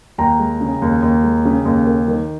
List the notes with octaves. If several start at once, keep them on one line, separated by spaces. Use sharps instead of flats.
D#2 G5 A#5
G#3
C#3
D#2
D#2
G#3
C#3
D#2
A#3
D#3